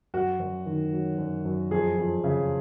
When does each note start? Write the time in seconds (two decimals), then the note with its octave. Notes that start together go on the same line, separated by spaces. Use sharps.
0.14 F#2 F#4
0.39 F#2
0.66 D#3
0.93 F#3
1.18 F#2
1.45 F#2
1.71 F2 G#4
1.97 F2
2.24 C#3